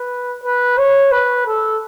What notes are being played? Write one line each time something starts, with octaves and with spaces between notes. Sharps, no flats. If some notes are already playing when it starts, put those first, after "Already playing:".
Already playing: B4
B4
C#5
B4
A4